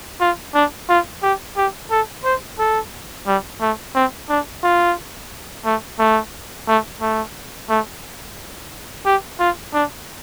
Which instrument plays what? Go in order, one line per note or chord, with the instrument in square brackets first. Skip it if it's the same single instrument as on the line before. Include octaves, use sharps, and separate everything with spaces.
[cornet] F4
D4
F4
G4
G4
A4
C5
A4
G3
A3
C4
D4
F4
A3
A3
A3
A3
A3
G4
F4
D4